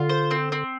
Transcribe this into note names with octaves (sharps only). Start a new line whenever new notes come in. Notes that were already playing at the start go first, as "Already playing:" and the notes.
Already playing: D3 F4
C5
C4
C4